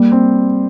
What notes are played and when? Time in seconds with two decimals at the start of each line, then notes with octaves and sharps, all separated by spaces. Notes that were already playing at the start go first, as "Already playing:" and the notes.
Already playing: G3 A#3
0.12 C4